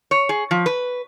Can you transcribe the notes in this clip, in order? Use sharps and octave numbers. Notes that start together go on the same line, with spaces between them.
C#5
G#4
F3
B4